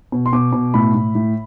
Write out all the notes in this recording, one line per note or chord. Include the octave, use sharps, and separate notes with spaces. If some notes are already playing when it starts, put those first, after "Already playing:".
B2
C6
B2 D6
B2
A2 B5
A2
A2